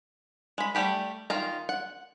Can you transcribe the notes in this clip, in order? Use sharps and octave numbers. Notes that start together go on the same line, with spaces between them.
G#3 B5
G3 A3 G4 B5
D#3 F4 A#5
F#5